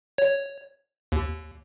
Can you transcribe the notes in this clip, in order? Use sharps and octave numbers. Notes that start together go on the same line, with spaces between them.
C#5
D#2